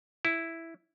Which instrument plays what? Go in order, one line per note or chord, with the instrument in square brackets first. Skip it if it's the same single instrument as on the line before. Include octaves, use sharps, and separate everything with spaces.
[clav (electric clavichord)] E4